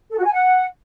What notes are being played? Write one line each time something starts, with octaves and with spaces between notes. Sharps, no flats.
A4
F#4
G#5
F#5